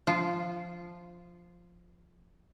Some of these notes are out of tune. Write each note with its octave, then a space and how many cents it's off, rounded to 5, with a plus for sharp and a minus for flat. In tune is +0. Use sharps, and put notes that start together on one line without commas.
F3 +0 F4 -15